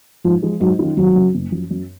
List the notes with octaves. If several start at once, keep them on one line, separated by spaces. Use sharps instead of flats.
G#2 F3
F3 G#3
G#2 F#3
D#3 F#3 C#4 F4
G#1 F#3
F#2 C#3
F#1
F#2 F3
F#2